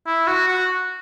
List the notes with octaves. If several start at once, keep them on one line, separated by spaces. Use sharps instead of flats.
E4
F#4
F#4